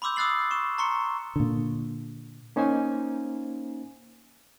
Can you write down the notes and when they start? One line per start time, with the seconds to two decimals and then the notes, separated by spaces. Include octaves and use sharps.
0.02 B5 C6 D6 E6 G6
0.16 D#6 E6 F#6 A6 C7 F#7
0.51 C#6 E7
0.78 A#5 C6 C#6 C#7
1.36 A#2 D3
2.56 A#3 C#4 D#4 C5 G#5